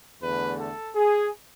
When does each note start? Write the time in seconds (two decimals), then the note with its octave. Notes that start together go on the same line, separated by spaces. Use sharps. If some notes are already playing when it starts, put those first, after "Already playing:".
0.21 E2 D3 A3 B4
0.58 A4
0.96 G#4